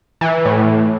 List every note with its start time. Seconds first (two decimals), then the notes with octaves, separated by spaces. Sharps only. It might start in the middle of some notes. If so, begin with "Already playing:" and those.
0.21 E3
0.45 A2